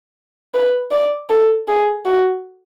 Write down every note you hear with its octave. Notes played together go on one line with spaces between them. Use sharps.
B4
D5
A4
G#4
F#4